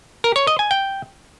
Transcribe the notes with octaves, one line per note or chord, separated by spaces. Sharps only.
A#4
C#5
D#5
G#5
G5